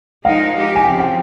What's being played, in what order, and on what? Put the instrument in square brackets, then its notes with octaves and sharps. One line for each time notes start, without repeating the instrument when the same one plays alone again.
[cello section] F3 G#3 D#4 A#4 [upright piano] F5
[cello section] G#3 D#4 G4
[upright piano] G#5
[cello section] C#3 F3 C4 [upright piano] G5
[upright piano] G5